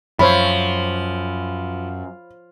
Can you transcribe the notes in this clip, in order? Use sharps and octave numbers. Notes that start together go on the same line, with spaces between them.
F#2 F3 C5 C#5 E5 B5